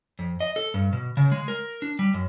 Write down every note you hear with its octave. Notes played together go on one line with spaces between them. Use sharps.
F2
D#5
A4
G2
B2
C#3
G#3
A#4
D4
G3
F#2